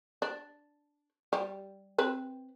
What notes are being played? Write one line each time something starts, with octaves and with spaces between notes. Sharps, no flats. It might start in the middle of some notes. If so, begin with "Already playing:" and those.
D4
G3
C4 B4